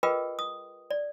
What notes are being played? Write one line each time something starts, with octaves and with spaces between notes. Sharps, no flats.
F4 G#4 A#4 B4 D#5 G5
D#6
D5